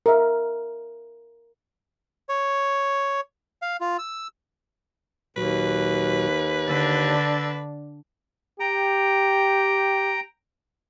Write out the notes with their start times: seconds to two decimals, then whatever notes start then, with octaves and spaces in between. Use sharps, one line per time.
0.06 A#4 E5
2.29 C#5
3.62 F5
3.81 F4
3.99 E6
5.36 D#2 A#2 F#3 F#4 B4
6.67 D3 D4 E6 A6
8.60 G4 G5 A#5